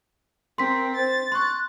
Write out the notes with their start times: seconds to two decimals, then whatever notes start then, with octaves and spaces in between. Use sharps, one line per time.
0.58 C4 A#4 C6 B6
0.96 C5 A6
1.32 C6 C#6 F#6